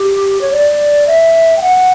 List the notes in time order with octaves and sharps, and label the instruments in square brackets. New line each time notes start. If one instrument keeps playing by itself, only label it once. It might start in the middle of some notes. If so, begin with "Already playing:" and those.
Already playing: [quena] G4
C#5
D5
E5
G5
F#5